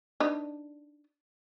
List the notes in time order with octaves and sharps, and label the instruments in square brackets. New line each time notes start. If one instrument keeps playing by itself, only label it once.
[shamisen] D4 D#4 B4